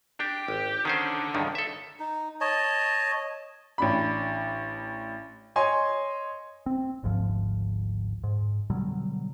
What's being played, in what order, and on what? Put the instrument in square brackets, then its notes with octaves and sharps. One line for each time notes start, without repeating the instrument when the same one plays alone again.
[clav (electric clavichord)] D4 [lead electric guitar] G4
[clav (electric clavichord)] G#1
[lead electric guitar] D3 [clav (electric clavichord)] D#3 C#4 C5
[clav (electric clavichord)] C#2 G2 D#3
A4 E5
[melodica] D#4
C#5 D#5 A5
[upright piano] A1 D4 B5
C#5 D#5 G#5 C6
[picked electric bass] C4
G#1 D2 G#2 F3
G#2
B2 D3 F#3 G3